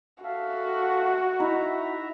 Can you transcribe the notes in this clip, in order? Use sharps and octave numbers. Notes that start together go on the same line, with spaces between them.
F#4 A4 E5 F5
D#4 E4 E5 A#5